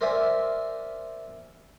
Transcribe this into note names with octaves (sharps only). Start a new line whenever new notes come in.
A#4 C5 D5 E5 G#5